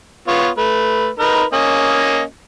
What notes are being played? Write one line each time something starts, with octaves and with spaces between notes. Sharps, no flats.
B3 F4 C#5
A3 B4
D#4 A#4 B4
A#3 C#4 D#5